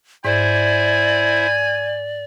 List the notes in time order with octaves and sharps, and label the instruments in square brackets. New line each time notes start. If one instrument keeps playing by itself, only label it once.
[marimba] G#2 [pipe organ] E4 C5 E5 [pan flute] D5 [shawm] G#5